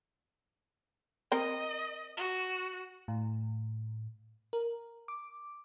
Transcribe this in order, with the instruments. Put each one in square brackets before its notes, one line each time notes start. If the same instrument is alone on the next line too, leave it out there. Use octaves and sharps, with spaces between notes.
[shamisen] C4 A#4 G5 [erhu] D#5
[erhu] F#4
[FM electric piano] A2
A#4
D6